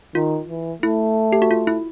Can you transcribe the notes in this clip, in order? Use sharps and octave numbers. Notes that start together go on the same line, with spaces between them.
D#3 F4
E3
A3 E4
G4
F#4
F4
E4